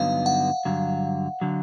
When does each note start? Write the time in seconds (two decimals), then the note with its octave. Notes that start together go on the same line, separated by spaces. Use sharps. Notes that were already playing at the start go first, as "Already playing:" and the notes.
Already playing: G2 D3 F#3 B3 D#4 F5
0.26 F#5
0.65 G2 D3 F#3
1.41 D3 F#3